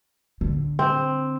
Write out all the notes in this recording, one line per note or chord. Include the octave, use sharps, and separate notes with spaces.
D3
C4